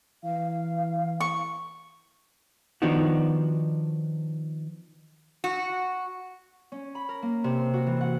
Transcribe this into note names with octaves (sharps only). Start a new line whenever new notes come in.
E3 F5
C#6
D#3 F3 B3 D4 D#4 F#4
F#4
C#4
B5
A#4
A#3
C3
C6
F#4
E3
F#5